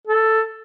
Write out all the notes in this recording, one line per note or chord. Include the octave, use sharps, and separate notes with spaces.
A4